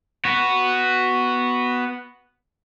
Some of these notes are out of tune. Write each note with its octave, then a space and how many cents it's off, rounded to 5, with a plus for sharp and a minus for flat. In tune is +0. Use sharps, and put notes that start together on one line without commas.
B3 +0 F#4 +0